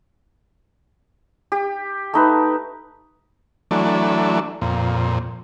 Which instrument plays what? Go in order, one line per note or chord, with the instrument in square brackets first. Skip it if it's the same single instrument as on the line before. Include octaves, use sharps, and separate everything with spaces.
[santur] G4
A3 D#4 B4
[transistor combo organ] E3 F#3 A3 D4
F2 A#2